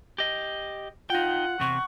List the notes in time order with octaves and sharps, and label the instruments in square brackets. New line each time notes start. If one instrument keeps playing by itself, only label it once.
[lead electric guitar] G4 D#5
[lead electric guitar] D#4 G5 [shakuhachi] F4 [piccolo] F#5
[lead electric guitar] E2 C3 [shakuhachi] C#6